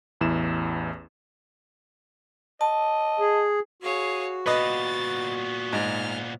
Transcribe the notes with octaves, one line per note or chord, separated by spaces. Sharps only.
A1 E2 E4 E7
D#5 A5
G#4
F#4 G#4 C#5 F5
A#2 B3 B4 D#5 A6
G#2 F6